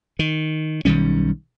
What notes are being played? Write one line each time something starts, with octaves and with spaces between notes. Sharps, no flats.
D#3
B1 D#3 G3 C#4